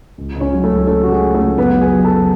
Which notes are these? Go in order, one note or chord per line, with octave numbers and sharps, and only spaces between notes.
C#2
C#2
C#4 C#5
F#3
A3 A4
C#2
C#3 A3 A4
C#3 F#4
G#3 G#4
C#3
A3 A4
C#2
F#1 B3 B4
F#3
G#4 G#5
F#3
A4 A5
F#1